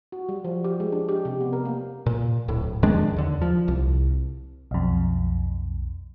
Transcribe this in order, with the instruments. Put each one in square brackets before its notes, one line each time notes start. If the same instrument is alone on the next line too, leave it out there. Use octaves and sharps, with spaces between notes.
[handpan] F#4
G3
F3
G4
G#3
D4
G4
C3
B3
A#4
A#3
[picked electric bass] A#2
D1 A2
F2 D#3 G#3 D4
D#2 D3
F3
C2
[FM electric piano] B1 F2